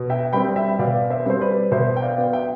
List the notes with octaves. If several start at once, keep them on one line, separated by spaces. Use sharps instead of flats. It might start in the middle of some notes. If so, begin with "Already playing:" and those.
Already playing: B2
E5 G5
G3 C4 G5 B5
E5 G5
B2 D5 F5
C5 E5
G3 C4 C5
B4 D5
B2 C5 E5
G5
D5 F5
B3
E5 G5